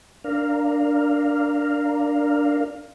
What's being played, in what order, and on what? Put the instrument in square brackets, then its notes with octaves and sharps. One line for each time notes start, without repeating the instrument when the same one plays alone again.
[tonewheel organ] D4 A#4 F5